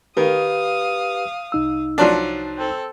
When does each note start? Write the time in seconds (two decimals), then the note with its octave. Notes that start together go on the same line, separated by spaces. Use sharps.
0.17 D#3 G4 B4 F5 D#6
1.52 C2 D#4 E6
1.98 F3 F#3 D4
2.58 C4 A4